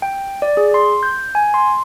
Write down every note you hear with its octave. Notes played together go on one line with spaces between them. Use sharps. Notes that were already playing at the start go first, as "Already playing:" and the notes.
G5
D5
G#4
C6
G6
G#5
C6